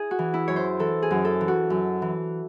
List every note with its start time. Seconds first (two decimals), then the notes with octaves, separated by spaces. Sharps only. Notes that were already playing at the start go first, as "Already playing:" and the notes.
Already playing: E4 G#4
0.11 F#4
0.19 E3
0.34 E4
0.48 F#2 C#5
0.56 C5
0.79 E3 A4
1.02 G#4
1.11 F#2
1.25 A4
1.41 E3
1.48 F#4
1.70 F#2
2.02 E3